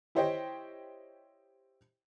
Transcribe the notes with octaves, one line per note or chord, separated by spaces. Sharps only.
E4 G4 C5 C#5 D#5 G5